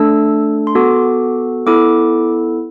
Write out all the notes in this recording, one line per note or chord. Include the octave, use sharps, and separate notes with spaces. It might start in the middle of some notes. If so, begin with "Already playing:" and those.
Already playing: A3 D4 A4 E6
C6
B3 F#4 A4 D6
B3 E4 A4 D6